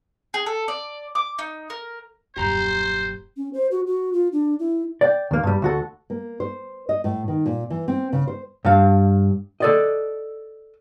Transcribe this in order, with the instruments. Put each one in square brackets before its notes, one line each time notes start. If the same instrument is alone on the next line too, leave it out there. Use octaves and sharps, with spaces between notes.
[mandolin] G#4
A4
D5
D6
D#4
A#4
[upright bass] D#1 F#2 [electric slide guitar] G4 A#5 [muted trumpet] C5
[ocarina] C#4
C5
F#4
F#4
F4
D4
E4
[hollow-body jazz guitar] D5 G5
D#2 A#3
G2 G3
D2 F#4 A4
[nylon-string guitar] A#3
C5
D#5
A2
D#3
A#2
E3
C4
C#3
C5
[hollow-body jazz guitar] G2 F5
A4 D5 D#5